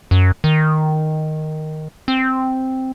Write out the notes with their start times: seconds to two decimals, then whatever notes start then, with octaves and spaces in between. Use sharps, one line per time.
0.11 F#2
0.44 D#3
2.08 C4